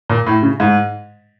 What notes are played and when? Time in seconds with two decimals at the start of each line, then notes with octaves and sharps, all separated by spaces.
0.09 A#2
0.27 A2
0.43 C#3
0.60 G#2